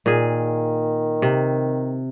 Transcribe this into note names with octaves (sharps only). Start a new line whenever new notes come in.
A#2 D#3 G#4
C3